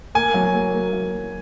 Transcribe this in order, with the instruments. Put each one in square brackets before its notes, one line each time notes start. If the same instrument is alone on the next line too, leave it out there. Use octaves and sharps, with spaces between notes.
[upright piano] A#3 [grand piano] G#5
[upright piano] F#3
A#3
A#3
F#3